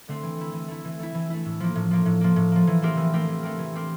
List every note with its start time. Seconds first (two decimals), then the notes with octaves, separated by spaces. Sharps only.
0.08 D3 A3 C4
0.23 E3
0.38 A3 E4
0.53 E3
0.68 A3 E4
0.85 E3
0.99 A3 E4
1.14 E3
1.30 A3 E4
1.45 A2
1.60 F3 A#3
1.75 A2
1.91 F3 A#3
2.06 A2
2.21 F3 A#3
2.36 A2
2.52 F3 A#3
2.67 E3
2.82 A3 C4 G4 A#4
2.97 E3
3.13 A3 C4 G4 A#4
3.28 E3
3.43 A3 C4 G4 A#4
3.59 E3
3.74 A3 C4 G4 A#4